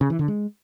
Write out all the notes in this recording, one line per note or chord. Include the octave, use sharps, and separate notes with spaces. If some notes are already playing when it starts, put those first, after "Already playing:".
C#3
E3
D3
G#3